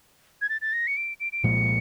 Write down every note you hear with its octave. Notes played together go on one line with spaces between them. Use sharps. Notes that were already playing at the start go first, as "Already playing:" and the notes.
G#6
A6
A6
A#6
C#7
D7
D7
D7
C2 A#2 F3 G#3 C#7